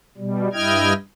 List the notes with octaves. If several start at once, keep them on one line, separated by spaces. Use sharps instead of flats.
B2 G3
G2 E4 D#5 G5 F6 G#6